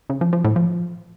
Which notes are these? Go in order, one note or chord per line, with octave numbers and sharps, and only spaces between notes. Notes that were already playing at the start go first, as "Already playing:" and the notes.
C#3
F3
F3
A2
F3